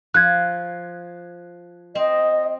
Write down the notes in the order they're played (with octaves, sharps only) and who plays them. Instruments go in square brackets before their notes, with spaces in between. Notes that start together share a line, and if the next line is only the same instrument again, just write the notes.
[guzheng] F3 [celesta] F#6 G#6
[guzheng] C4 [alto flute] D#5